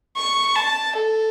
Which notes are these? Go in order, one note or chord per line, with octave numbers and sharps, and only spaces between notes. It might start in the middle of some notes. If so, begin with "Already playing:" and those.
C#6
A5
A4